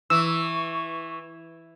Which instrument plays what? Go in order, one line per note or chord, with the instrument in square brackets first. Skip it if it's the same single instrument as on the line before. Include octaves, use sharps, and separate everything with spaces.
[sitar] E3 [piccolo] C#6 [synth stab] E6